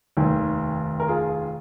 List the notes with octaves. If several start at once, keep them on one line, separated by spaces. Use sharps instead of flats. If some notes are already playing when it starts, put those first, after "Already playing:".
F1 D#2 D#3
A#4
F4 G#4